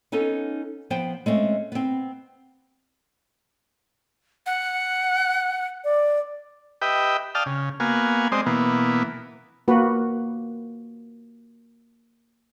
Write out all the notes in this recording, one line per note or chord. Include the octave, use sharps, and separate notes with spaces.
B3 C#4 D#4 A4
F3 B3 C5 G5
G#3 A3 C4 C#4
B3 C4
F#5
D5
G4 B4 D#5 E5 G5
D5 F5 G5 A5 D#6 F6
C#3
A#3 B3 F#4 F5 G#5
G#3 C4 C5 D5 D#5
B2 E3 A#3 B3
A#3 F#4 B4